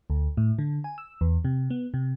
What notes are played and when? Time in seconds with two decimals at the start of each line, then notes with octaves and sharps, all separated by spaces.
0.10 D2
0.37 A2
0.59 D3
0.84 G#5
0.98 E6
1.21 E2
1.45 C3
1.70 B3
1.94 C3